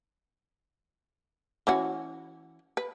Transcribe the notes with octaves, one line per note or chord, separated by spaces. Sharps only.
E3 C#4 F#4
B4